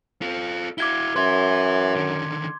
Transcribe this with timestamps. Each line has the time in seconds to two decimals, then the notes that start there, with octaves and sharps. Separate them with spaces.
0.22 F4 A4
0.78 E4 F#4 D6 G#6 G7
1.16 F#2 B4 E5 C6 G#6
1.96 D3 D#3